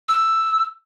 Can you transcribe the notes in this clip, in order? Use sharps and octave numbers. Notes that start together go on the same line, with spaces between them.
E6